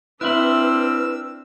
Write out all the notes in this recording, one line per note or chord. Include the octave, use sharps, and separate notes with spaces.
C4 D4 E4 B4 E5 B5 E6 F6